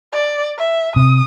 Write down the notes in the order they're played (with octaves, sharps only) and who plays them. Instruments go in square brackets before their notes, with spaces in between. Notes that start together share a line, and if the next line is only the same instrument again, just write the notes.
[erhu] D5
E5
[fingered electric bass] C3 [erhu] D#6